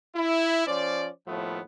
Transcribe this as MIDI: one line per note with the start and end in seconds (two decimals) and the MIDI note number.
0.15 0.66 64
0.67 1.09 53
0.67 1.09 61
0.67 1.09 72
0.67 1.09 74
1.27 1.60 39
1.27 1.60 45
1.27 1.60 53
1.27 1.60 57
1.27 1.60 59